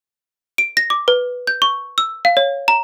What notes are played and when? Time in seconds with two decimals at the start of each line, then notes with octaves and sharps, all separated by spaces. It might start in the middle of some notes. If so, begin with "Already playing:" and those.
0.58 D7
0.77 A#6
0.90 D6
1.08 B4
1.47 G6
1.62 C#6
1.98 E6
2.25 F5
2.37 C#5
2.68 A#5